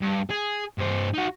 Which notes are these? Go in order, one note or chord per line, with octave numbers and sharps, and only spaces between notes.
G2
G#4
G2 C5
D#4 F#4